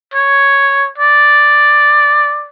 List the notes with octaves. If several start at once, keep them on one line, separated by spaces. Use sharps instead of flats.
C#5
D5